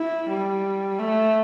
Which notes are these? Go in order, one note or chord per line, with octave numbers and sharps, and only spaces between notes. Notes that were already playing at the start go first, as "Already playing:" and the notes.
Already playing: E4
G3
A3